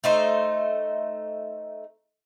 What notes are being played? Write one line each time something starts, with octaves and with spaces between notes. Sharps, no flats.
A3 D#4 C5